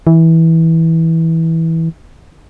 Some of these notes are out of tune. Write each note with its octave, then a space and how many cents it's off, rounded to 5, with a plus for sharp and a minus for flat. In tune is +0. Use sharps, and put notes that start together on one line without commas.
E3 -15